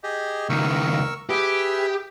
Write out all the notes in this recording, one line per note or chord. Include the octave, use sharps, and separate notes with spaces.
G4 G#4 D#5
C#2 D#3 A#4 C#6 E6
G4 G#4 B4 E5